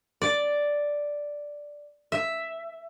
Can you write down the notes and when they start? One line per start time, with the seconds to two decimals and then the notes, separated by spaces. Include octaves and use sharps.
0.22 D5
2.12 E5